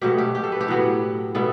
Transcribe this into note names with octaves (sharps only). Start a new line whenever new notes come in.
B2 F#3 A3 G4
G4
G4
A4
B4
G4
A2 F#3 B3
B2 G3 B3 E4 A4